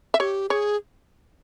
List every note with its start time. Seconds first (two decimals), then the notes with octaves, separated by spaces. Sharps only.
0.14 E5
0.19 G4 C#5
0.49 G#4 C#5